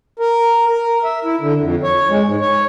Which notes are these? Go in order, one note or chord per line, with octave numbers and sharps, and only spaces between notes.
A#4
A#4
E5
E4
D3
F2
C#5
G#3
G#2
C#5